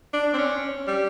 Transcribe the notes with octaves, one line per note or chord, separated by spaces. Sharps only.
D4
C4
C#4
G3